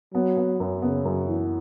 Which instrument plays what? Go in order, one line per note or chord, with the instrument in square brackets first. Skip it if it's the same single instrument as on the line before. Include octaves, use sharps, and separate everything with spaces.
[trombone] F#3 [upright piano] B3
[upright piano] B3
F#2
[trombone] C#3 [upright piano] B3
[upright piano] F#2
E3